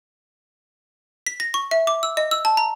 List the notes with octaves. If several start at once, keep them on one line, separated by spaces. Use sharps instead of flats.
B6
A#6
C#6
E5
D6
E6
D#5
E6
A5
A#5